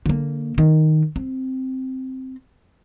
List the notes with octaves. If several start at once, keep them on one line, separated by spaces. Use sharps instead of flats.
D3 A#3
D#3
C4